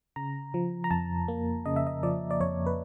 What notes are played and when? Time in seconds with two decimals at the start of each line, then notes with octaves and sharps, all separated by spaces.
0.16 C#3 A#5
0.54 F3
0.84 A#5
0.91 F2 A5
1.28 A#3
1.66 C#3 D#5
1.76 E5
1.87 D#5
2.03 F3 D5
2.31 D5
2.40 F2 C#5
2.66 B4